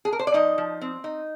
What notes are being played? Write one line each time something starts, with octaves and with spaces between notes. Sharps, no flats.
G#4
A#4
C5
D5
F3 D#4 D#5
F3
C4
D#4